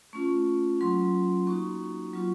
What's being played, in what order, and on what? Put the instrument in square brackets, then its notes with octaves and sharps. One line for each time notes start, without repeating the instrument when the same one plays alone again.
[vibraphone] A3 C#4 F4 C#6
F#3 A#3 C#4 F4 C6
A#3 D#4 F#4 C#6
F#3 C4 F4 C#6